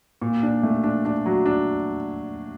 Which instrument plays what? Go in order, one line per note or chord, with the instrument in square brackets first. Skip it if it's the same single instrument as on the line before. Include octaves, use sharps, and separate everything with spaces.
[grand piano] A#2
D4
A3
D4
D4
F#3
D4